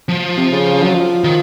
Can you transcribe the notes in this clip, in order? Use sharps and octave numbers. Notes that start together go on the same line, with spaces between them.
F3
C3
C#3
F#3
F3
D#3